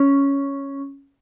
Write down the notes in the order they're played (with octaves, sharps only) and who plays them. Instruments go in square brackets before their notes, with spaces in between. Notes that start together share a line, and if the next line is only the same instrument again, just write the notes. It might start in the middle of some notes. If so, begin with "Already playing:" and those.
Already playing: [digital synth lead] C#4